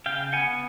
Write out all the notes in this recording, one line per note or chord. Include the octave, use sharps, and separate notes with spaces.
C#3 F5 G5
B3 F#5 G#5